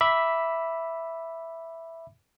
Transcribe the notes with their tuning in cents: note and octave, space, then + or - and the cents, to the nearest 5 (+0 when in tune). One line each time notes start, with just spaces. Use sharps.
E5 +0 B5 -5 D6 +0